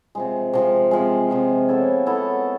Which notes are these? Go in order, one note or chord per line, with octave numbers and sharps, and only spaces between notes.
C3 F3 G#3
C3 F3 G#3
C3 F3 G#3
C3 F3 G#3
B3 E4 A4 C#5
B3 E4 A4 C#5